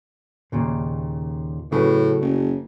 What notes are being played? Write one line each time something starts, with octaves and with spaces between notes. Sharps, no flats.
D#2 A#2 C#3
A2 C#3 F#3 B4
F#1